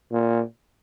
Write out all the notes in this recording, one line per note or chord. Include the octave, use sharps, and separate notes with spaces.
A#2